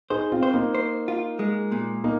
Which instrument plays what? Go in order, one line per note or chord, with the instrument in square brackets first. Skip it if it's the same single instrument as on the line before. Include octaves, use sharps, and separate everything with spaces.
[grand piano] D#4 G#4 [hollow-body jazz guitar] C5
[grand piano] C4 F4
[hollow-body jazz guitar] C5
[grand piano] A#3 D#4
[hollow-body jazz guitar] C5
F4
G#3
A#2
[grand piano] A#3 D#4